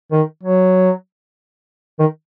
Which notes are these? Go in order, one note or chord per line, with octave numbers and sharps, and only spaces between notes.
D#3
F#3
D#3